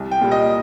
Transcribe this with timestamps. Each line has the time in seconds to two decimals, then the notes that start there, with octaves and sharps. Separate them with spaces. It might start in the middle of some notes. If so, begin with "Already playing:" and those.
Already playing: C2
0.11 G5
0.21 A#2 G3
0.31 D#5